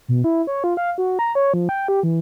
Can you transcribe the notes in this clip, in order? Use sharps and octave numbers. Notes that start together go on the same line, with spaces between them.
B2
E4
C#5
F4
F5
F#4
A#5
C#5
F3
G5
G4
E3